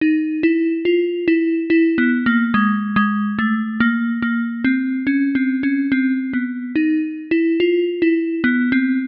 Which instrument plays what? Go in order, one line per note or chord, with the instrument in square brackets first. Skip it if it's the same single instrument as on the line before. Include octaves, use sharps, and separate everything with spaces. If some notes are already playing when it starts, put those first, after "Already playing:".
[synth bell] D#4
E4
F4
E4
E4
B3
A#3
G#3
G#3
A3
A#3
A#3
C4
C#4
C4
C#4
C4
B3
D#4
E4
F4
E4
B3
C4